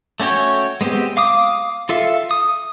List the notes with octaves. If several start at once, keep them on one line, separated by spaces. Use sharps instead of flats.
A3 C#4 F#4 C#5 G5
G#3 B3 C4 G4
F5 D6 D#6
F4 A4 E5 F5
D#6